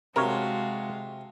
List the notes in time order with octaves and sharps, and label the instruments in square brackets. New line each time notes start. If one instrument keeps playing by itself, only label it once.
[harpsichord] C3 [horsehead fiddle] G#3 F5 [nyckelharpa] F#4 A5 [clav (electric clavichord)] A#4 C#5